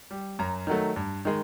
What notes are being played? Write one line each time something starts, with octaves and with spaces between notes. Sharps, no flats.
G3
F#2 A#5
D#3 F#3 A3
G2
D#3 G#3